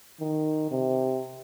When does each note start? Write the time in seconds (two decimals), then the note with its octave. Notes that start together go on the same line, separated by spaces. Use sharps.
0.20 D#3
0.71 C3